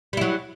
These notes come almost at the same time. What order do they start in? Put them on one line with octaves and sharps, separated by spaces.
G3 E4 F#3